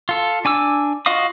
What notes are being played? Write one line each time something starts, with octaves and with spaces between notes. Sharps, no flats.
F4 A4
D4 G#5 D6 E6
F4 F#4 D#5 F5 D#6